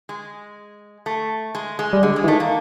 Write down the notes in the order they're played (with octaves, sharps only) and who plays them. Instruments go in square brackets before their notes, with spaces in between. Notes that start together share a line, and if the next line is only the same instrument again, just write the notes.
[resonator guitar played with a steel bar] G#3
A3
G#3
G#3
[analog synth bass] G3
[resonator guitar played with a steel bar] D3 [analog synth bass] G#3
[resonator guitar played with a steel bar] G#3
[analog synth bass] E3
[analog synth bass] D#3 [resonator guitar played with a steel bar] A3
[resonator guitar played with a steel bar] A#3